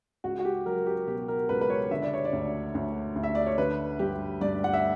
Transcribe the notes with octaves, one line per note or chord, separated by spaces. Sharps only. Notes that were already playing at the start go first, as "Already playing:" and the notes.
C#2 F#4
F#4
G4
F#3 A#4
G4
B2 G4
A#4
C#2 B4
B4
C#5
D3 E5
D5
C#5
D5
D2
D2
D2
E5
D5
C#5
D3 B4
G2 G4
G2 D5
F#5
E5